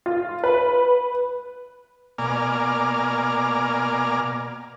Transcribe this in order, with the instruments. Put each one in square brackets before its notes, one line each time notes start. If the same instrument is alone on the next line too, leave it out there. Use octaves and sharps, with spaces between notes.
[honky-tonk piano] F4
B4
[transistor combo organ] B2 A#3 D5 G#5 A#5 F6